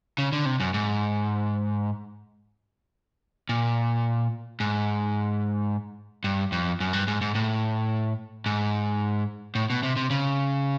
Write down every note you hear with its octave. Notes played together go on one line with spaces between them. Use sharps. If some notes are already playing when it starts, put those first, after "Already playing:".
C#3
D3
C3
F#2
G#2
A#2
G#2
G2
F2
F#2
G2
G#2
G#2
A2
G#2
A2
B2
C3
C3
C#3